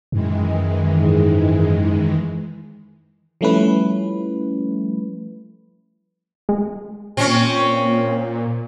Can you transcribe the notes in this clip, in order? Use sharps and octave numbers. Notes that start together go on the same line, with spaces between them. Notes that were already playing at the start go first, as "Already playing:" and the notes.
F#2 D#3 E3 G#3
G#2
F3 G3 A3 C#4 E4 B4
G#3
A#2 C4 C#4